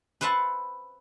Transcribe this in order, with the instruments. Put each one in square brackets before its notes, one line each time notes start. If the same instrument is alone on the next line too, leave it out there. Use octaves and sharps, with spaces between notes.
[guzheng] B4 C5 E5 F#5 A5